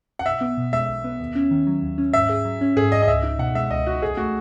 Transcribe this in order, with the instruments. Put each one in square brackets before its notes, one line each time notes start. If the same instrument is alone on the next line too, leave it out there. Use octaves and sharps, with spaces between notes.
[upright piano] F#5
[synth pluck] B1 [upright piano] E5
[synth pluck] B3
B2
[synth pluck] G#3 [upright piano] E5
[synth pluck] B1
B3
D#2
C#4
D#3
F#3
D#2
C#4
[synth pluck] G#2 [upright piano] E5
[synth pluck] G#4
F#3
C#4
[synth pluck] G#2 [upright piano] G#4
[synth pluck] G#4 [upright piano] D#5
[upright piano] D#5
[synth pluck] C#2 [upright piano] E5
[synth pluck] D#4
[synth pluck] B2 [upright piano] F#5
[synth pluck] G#3 [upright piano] E5
[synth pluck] C#2 [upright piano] D#5
[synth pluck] D#4 [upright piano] F#4
[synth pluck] B1 [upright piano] G#4
[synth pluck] A3 [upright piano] F#4